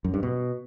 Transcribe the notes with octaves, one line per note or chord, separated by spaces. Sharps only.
F#2
G2
B2